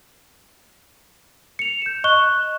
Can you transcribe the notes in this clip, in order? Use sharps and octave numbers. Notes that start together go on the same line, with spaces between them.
C#7 F7
G6 E7
D#5 C#6 F#6 G7